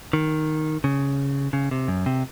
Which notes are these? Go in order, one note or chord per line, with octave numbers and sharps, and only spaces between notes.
D#3
C#3
C#3
C3
F#2
C3